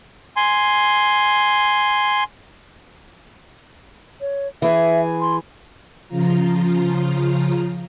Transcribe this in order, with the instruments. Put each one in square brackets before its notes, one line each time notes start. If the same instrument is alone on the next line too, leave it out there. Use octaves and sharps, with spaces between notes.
[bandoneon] G#5 C6
[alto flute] C#5
[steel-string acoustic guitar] E3 G#4 [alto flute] E5
[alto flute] C6
[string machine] C#3 F3 F4 A#5